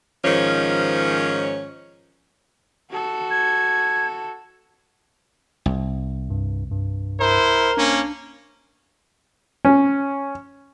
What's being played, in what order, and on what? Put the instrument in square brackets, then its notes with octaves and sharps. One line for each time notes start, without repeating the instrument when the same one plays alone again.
[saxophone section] G#2 D#3 F3 C#4 C#5
[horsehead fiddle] F#4 A4
[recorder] G#6
[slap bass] C2
[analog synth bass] G2
G2
[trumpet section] E4 C5 [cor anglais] A#4
[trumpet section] A#3 C#4 [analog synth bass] D4
[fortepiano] C#4